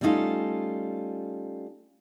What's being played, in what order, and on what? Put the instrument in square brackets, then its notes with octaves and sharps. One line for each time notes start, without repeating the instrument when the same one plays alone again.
[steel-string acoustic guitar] G3 A3 C#4 D#4 F4 A4